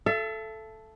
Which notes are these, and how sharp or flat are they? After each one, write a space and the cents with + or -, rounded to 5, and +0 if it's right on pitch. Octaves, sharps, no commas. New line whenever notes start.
A4 -5 E5 +40